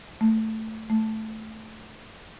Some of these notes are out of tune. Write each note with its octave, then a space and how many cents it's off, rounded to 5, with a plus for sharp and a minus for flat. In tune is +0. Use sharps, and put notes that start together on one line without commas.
A3 +5
A3 -5